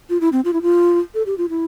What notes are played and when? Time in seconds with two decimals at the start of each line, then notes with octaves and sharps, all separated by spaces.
0.10 F4
0.21 E4
0.32 C4
0.45 F4
0.53 E4
0.62 F4
1.14 A4
1.26 G4
1.38 F4
1.50 E4